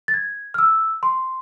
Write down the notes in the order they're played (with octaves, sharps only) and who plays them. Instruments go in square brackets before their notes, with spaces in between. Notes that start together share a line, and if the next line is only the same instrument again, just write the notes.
[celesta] A6
G#6
F6
E6
C6